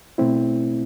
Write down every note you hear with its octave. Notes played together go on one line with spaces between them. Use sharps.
B2 A3 C4 E4